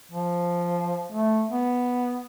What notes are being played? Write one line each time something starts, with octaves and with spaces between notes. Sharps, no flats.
F3
A3
B3